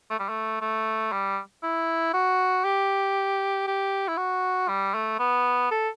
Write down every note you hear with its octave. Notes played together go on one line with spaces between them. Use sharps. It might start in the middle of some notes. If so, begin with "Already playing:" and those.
A3
G3
A3
A3
G3
E4
F#4
G4
G4
E4
F#4
G3
A3
B3
A4